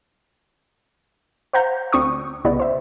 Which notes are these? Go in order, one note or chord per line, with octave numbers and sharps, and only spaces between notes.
C5 F5 F#5 A#5 G6
D2 C4 D4 C#6 D#6
C2 C#3 B3 E4 D5 D#5
C5 E5